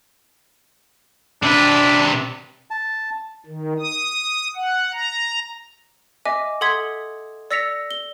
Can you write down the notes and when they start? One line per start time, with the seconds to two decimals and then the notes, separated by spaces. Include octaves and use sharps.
1.43 C3 D4 B4
2.71 A5
3.46 D#3
3.79 D#6
4.56 F#5
4.93 A#5
6.26 D#5 E5 G#5 D6
6.61 A4 F#5 C6 D#6 G#6 B6
7.51 D5 E6 A#6 B6 C#7 F7
7.91 G7